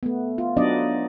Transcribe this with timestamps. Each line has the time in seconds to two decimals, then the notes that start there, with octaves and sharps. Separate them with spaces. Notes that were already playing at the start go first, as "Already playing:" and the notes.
0.03 A3 B3
0.38 F4
0.57 F#3 B3 D4 D#4 D5 D#5